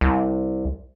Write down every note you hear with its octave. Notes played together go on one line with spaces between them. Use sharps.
C2